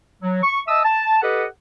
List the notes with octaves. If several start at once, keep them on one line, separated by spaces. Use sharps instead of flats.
F#3
C#6
D#5 E5 A5 D#6 E6
A5
G4 A4 B4 D#5 F#5